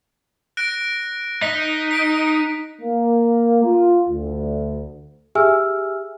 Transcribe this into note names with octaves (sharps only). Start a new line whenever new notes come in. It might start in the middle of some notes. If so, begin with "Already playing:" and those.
F#6 A#6 D7
D#4 B6
B6 D7
A#3
F4
D2
G4 G#4 E5 G#5 E6 F6